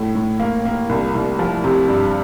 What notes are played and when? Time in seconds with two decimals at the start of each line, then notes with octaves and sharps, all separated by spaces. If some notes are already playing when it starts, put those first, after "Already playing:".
Already playing: A2
0.15 A2
0.40 A#3
0.65 A#3
0.89 C2
1.15 C2
1.39 F3
1.64 C3
1.88 G2